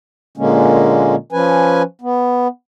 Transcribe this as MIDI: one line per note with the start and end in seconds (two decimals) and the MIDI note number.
0.37 1.15 46
0.37 1.15 50
0.37 1.15 56
0.37 1.15 58
0.37 1.15 61
1.32 1.82 53
1.32 1.82 61
1.32 1.82 71
1.32 1.82 80
2.01 2.48 59